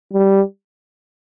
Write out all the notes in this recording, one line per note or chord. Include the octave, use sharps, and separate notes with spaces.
G3